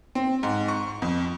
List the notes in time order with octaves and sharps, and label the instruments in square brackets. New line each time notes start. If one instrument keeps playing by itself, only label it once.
[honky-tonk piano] C4
G#2
C#6
F2